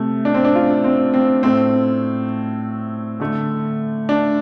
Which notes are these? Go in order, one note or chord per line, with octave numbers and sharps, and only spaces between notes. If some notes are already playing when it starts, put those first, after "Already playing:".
Already playing: C3 A3
D4
C4
D4
F4
C4
C4
A2 A3 C4
D3 A3
D4